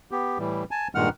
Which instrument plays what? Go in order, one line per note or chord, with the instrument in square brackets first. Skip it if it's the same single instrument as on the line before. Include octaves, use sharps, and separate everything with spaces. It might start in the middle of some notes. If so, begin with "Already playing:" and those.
[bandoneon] B3 G4
A2 E3 G3
G#5 A5
G2 A#2 D#3 G#3 F#5 F6